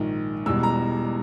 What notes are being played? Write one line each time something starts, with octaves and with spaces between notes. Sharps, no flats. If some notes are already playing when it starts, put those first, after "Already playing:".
Already playing: A#1 G#2 D#3
E1 E2 B2 G3 E6
A#5